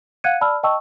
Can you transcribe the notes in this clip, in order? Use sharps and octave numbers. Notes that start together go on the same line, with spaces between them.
F5 F#5 F#6 G#6 C#7 D#7
D5 A5 B5 E6 F6
D#5 G5 A5 C#6 E6